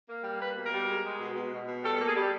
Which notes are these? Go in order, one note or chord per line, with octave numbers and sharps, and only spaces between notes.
A#3
G3
A#3 B4
B2
A#4
G3
G#3
G#3
B2
B2
B2
B2
G3 A4
A#3 A4
G#4
G3